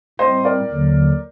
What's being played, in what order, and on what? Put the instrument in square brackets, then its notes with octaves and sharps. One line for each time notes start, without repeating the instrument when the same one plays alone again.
[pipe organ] A2 G3 C4 [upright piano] C5 D#5
[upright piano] A#4 D5
[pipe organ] D#2 D3 F#3